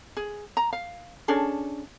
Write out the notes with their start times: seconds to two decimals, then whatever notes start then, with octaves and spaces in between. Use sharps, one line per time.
0.17 G#4
0.57 A#5
0.73 F5
1.28 C#4 D4 G#4 A4